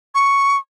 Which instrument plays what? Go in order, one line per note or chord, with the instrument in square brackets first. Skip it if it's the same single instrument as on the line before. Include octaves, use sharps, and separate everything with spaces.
[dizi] C#6